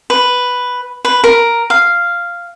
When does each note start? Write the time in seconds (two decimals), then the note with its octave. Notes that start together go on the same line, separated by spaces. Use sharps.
0.10 B4
1.05 B4
1.24 A#4
1.70 F5